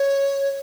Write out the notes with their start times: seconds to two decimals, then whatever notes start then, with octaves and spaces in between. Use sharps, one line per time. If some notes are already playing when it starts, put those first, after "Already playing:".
Already playing: C#5